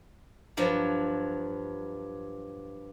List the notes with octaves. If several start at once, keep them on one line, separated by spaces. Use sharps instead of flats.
G2 F3 F#3